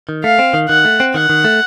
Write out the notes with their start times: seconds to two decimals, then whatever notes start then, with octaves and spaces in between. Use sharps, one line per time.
0.09 D#3
0.24 A3 F5
0.39 C4
0.54 D#3
0.69 D#3 F#5
0.85 A3
1.00 C4
1.14 D#3 F#5
1.30 D#3
1.45 A3